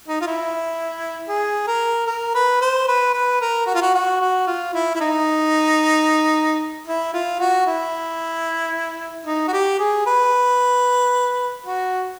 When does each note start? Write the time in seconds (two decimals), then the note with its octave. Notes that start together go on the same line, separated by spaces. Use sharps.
0.08 D#4
0.21 F4
0.27 E4
1.28 G#4
1.67 A#4
2.07 A#4
2.35 B4
2.61 C5
2.88 B4
3.14 B4
3.41 A#4
3.67 F#4
3.74 F4
3.82 F#4
3.95 F#4
4.21 F#4
4.47 F4
4.74 E4
4.95 E4
5.01 D#4
6.88 E4
7.14 F4
7.40 F#4
7.67 E4
9.26 D#4
9.48 F#4
9.53 G4
9.79 G#4
10.07 B4
11.66 F#4